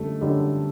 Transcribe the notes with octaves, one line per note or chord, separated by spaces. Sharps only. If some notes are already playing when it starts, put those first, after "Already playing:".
Already playing: F#2 D3 G3 A3
F#2 D3 G3